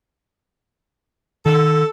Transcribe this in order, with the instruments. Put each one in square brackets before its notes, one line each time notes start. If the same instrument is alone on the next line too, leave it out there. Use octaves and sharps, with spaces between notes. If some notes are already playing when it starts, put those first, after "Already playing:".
[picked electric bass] D#3 [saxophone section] A4